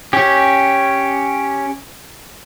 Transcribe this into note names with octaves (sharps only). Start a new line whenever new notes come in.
C#4 G4